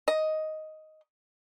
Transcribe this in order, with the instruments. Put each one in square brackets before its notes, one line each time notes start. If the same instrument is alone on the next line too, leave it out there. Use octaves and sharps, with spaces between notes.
[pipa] D#5